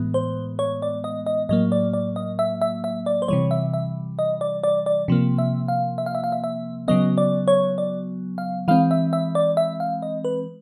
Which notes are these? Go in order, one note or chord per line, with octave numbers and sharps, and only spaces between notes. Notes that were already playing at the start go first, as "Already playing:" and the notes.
Already playing: A2 E3 G#3 B3
C5
C#5
D5
D#5
D#5
A2 F#3 A#3 D#5
D5
D5
D#5
E5
E5
E5
D5
C5
C3 E3 G3 C#5
E5
E5
D#5
D5
D5
D5
C3 F3 A#3
E5
F5
E5
F5
E5
F5
E5
E5
C#3 F#3 B3 D#5
D5
C#5
D5
F5
E3 G#3 C4 F5
E5
E5
D5
E5
F5
D#5
B4